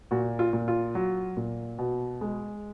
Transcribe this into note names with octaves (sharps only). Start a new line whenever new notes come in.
A#2 F#4
F4
A#2
F4
F#3
A#2
B2
G#3